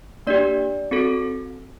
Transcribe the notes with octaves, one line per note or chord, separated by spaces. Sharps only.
A#3 D4 G4 D5
C4 F#4 A4